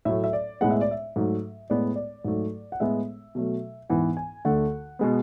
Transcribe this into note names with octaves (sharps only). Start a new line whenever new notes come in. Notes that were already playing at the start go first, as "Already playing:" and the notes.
A2 F#3 A3 E5
E5
D5
A2 G#3 B3 F#5
E5
D5
E5
G#2 F#3 A3
A2 G#3 B3 D5
D5
G#2 F#3 A3
F#5
A2 G#3 B3 E5
B2 F#3 A3
G#2 E3 B3 F#5
G#5
D2 D3 A3 F#5
B2 G#3 B3